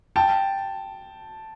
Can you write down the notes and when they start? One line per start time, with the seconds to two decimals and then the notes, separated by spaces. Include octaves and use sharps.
0.16 G5 A5